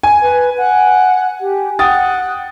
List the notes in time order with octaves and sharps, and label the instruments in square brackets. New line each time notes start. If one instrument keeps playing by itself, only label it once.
[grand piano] G#5
[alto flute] B4
F#5
G4
[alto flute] F#5 [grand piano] G5 D#6 A6